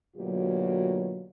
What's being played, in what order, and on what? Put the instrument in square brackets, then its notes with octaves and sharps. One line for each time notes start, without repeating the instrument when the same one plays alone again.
[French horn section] D2 B2 F#3 A#3 F4 G4